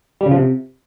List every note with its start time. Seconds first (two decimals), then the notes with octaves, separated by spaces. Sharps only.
0.21 G3
0.26 C#3
0.31 F3
0.36 C3